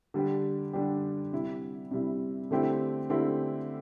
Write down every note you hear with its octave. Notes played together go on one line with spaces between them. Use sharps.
D3 G3 D4 G4
D3 G3 D4 G4
C3 G3 E4
C3 G3 E4
D3 A3 C4 E4 G4
D3 A3 C4 E4 G4